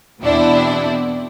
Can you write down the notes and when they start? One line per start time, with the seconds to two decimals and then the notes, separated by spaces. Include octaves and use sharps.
0.21 E2 B2 C4 D4 E4